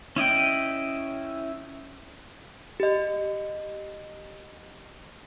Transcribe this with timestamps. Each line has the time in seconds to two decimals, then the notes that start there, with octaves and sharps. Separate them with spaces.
0.16 C#4 E4 D#5 G5
2.80 G4 D#5